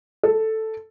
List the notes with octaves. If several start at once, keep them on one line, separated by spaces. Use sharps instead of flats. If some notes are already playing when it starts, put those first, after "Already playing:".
A4